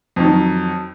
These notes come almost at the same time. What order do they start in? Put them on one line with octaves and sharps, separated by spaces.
F2 D#3 F#3